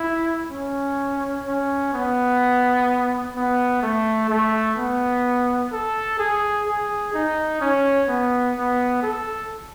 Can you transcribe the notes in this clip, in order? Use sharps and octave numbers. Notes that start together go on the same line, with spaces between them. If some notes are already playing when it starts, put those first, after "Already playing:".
Already playing: E4
C#4
C#4
B3
B3
A3
A3
B3
A4
G#4
G#4
D#4
C#4
B3
B3
A4